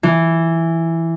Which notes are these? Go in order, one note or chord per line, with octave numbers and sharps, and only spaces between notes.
E3